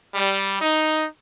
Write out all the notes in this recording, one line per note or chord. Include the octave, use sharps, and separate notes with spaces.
G3
D#4